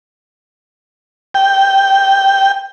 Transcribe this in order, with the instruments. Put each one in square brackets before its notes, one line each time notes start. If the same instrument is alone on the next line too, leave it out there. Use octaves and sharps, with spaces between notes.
[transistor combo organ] G5